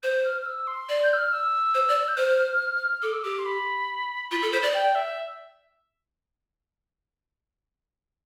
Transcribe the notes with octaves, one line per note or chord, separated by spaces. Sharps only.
C5 G6
F6
F6
E6
C6
D5
G6
E6
F6
E6
C5
D5
G6
C5 F6
A4 D6
E6
G4 D6
C6
B5
F4 B5
A4
C5
D5
G5
E5